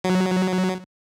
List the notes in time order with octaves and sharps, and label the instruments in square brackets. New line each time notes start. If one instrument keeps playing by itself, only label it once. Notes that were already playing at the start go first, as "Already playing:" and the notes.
[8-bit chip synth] F#3